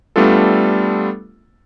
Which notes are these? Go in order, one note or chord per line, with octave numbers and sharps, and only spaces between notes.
G3 A3 B3 D4 F4 A4